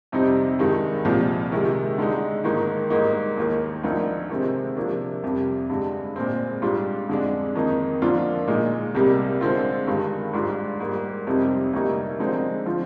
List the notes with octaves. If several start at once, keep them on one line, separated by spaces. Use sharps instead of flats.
F2 C3 G3 C4 D#4
G2 D#3 G#3 D#4
C2 A#2 F3
C3 D#3 G#3
D3 G#3 D#4
G#2 D#3 A#3 D#4
G#2 G3 A#3 D#4
D#2 D#3 A#3
D2 D3 F3 A#3 D#4
C3 D#3 G#3 C4
C3 F3 A#3 D4
F2 C3 G3
G2 D3 G#3
A#2 G#3 C4
G#2 G3 D4 F4
F2 D3 G#3 D4
F2 D#3 A#3 D#4
D3 F3 A#3 D4 F4
A#2 G#3 D#4
C2 C3 G3 A#3
D3 G#3 C4 F4
G2 D#3 G#3
G#2 G3 D4 F4
G#2 G3 A#3
F2 C3 G3 C4 D#4
D2 C3 G3 A#3 D#4
D3 F3 G#3 C4 D#4
D3 F3 C4 F4